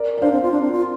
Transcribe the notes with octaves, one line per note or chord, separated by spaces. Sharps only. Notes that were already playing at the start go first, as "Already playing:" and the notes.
Already playing: A#4 D5
D5
D4 C5 F5
C4
F4
D4
C4
F4